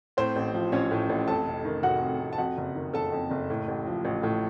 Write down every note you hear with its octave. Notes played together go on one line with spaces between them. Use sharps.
A2 C4 C5
A1
F3
A1 C#4 C#5
A2
A1
F2 A4 A5
F1
D#3
F1 F#4 F#5
F2
F1
A5
F2 F#4 F#5
F#1
D#3
F#1 A4 A5
F2
F#1
A2
A1
F3
A1
A2